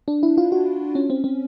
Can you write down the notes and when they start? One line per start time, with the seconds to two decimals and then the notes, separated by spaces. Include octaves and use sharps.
0.08 D4
0.23 E4
0.38 F4
0.52 F#4
0.95 C#4
1.10 C4
1.24 C4